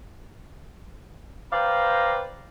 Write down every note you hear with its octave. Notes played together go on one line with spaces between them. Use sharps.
B4 C5 D5 F5 G5 A#5